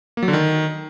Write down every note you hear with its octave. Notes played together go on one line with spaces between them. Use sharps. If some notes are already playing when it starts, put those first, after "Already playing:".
A#3
F#3
D3
D#3